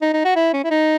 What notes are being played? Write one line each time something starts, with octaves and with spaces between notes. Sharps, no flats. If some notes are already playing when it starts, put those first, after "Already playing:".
D#4
D#4
F#4
E4
C#4
E4
D#4